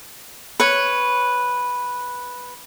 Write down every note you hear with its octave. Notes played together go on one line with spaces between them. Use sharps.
B4 C#5